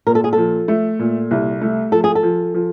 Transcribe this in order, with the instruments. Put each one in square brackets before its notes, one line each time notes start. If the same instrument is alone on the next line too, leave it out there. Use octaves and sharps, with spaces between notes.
[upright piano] A#2 [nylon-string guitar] A#4
[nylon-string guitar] A4
G#4
[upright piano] F3 [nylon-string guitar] A4
[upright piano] A3
A#2
C2
A3
[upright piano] F3 [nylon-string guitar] A4
[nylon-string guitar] G#4
A4
[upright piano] F3
F3